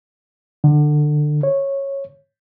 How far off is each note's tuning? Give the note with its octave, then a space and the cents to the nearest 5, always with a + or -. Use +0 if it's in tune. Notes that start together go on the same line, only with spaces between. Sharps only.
D3 +20
C#5 -10